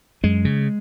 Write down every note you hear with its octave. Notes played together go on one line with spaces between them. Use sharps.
F#2 G#3
C#3